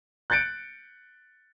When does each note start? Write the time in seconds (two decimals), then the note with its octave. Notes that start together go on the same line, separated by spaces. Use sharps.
0.30 F#6 G6 A6 C#7 D7